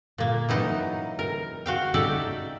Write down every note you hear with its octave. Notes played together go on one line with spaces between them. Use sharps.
A#2 A#3
E3 F#3 D#4
A#4
F#4 F5 G5
D#4 G4 A4 D5 E5